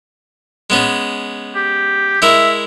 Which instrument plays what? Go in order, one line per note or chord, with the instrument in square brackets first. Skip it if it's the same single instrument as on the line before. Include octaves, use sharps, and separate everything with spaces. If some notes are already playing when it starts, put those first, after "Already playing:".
[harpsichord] G#3 B3 C#4
[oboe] G4
[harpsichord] G#3 E4 A#4 [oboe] E5